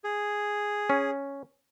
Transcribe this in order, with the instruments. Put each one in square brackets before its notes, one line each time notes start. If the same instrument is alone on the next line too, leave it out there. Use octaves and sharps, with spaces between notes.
[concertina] G#4
[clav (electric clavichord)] C#4